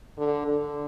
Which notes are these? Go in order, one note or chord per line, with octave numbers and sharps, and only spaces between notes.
D3
D3